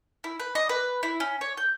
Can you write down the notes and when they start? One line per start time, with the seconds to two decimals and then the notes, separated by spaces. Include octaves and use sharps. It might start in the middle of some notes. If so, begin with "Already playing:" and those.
0.24 E4
0.40 B4
0.55 D#5
0.69 B4
1.03 E4
1.20 C#4
1.41 C#5
1.57 G6